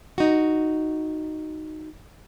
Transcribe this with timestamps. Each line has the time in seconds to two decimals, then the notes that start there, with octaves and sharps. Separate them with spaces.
0.18 D#4 F#4